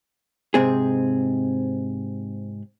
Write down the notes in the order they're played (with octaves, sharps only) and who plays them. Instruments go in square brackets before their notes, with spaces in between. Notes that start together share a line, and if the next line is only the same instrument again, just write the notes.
[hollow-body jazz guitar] G#2 C3 C4 G#4